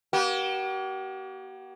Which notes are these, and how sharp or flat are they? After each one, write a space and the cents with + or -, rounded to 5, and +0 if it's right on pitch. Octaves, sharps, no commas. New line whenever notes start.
A#3 +40 G4 -45